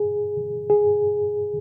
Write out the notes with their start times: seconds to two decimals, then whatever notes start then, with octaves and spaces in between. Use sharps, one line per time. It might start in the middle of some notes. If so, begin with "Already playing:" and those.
Already playing: G#4
0.70 G#4